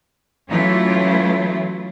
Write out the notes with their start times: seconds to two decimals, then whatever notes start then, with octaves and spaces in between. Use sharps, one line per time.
0.50 E3 F#3 A3 C#4 E4 F4